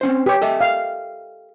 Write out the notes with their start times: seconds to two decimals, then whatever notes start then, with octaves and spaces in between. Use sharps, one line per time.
0.01 C4 C#4 C5
0.26 G4 B4 C#5
0.42 A4 D#5 E5
0.61 F5